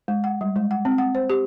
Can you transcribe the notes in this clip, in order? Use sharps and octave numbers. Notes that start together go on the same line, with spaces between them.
G#3
F#5
G3
G#3
F#5
C4
F#5
C5
G4